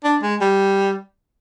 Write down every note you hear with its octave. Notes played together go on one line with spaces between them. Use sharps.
D4
G#3
G3